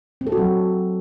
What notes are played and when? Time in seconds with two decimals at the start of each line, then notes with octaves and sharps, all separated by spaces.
0.21 C4
0.27 A4
0.32 F#4
0.38 F#3